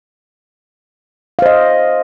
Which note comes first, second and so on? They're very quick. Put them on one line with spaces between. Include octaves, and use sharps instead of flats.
F5 C5 D#5